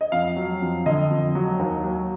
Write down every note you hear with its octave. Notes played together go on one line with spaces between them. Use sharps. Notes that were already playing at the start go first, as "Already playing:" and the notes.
D#5
F2 F5
F#3
F2
D3 D#5
F2
F#3
D#2
F#3